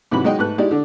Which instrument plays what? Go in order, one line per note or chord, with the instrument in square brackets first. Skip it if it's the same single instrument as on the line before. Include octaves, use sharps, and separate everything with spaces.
[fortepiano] G#2 C3 E3 F#3 B5
F#3 G#3 D#4 D#5 G5
G#2 A3 B4 F#6
G#3 D#4 E4 G4 D5
D3 D4